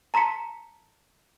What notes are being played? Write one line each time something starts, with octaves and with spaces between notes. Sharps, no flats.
A5 A#5 C6 B6 C#7